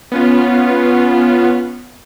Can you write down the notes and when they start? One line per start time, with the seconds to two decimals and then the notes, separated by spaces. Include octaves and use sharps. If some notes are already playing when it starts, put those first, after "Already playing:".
0.12 B3 C#4 F4